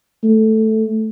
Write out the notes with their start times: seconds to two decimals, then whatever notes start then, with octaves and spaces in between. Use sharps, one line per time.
0.23 A3